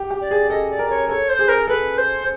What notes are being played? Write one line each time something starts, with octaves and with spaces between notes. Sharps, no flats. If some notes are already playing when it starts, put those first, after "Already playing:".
Already playing: G4
G4
D5
G#4
A4 D#5
D5
A#4
C#5
A4 C#5
C5
G#4
A#4
A4 B4
C5